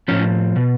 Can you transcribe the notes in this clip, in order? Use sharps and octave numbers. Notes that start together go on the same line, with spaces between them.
A2 F3 C#4
B2